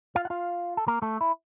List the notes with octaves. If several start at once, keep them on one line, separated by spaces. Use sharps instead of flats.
F4 F5
F#5
F4 F5
A4
A#3 A#4
A3 A4
E4